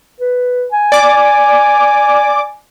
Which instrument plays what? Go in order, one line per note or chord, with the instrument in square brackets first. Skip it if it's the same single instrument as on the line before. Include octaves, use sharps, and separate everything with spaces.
[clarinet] B4
G#5
[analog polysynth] D5 D6